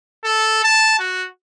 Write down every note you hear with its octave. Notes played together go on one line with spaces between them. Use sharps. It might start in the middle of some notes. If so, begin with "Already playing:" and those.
A4
A5
F#4